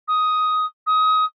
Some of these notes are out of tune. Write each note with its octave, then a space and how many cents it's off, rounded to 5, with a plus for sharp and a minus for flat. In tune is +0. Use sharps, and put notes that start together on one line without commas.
D#6 +10
D#6 +25